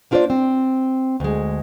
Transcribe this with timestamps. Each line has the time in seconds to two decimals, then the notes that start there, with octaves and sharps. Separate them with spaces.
0.11 A#3 D4 F4 A#4 C5 D5
0.30 C4
1.20 D2 G#3